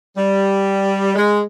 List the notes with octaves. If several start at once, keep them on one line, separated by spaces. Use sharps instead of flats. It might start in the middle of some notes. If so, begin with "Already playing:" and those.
G3
G#3